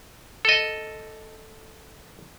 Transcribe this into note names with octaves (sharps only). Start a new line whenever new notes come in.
A4 D#5